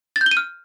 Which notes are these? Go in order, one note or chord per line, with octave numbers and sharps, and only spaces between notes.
A6
G6
G7
D#7
F6